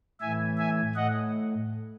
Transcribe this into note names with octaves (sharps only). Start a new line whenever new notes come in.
A2 E3 E5 G#5
E5 G#5
A2 D#5 F#5